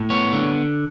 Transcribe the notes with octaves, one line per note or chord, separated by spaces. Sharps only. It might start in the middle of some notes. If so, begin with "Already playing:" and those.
Already playing: A2
B3 C#5
D3